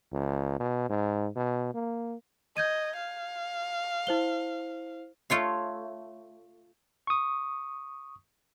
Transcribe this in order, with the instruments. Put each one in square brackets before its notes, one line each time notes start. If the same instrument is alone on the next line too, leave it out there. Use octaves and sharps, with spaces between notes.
[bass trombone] C#2
B2
G#2
B2
A#3
[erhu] D#5 [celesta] G6 G#6 D#7
[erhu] F5
[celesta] E4 C5 G7
[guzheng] A3 F4 C#5 F5
[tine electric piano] C#6 D#6